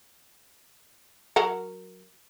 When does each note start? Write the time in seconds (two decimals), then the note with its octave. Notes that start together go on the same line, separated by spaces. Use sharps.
1.36 F#3 A#4 F#5